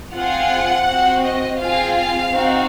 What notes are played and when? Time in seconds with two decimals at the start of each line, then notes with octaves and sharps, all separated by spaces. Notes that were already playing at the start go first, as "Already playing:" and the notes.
0.15 C4 F4 G#4 F#5
0.86 C4 F#4
1.23 D#5
1.58 C4 F4 G#4 F5
1.95 F5
2.31 C4 D#4 F#4